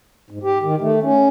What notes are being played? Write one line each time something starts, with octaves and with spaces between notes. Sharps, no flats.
G#2
G4
D#3
A3
C#4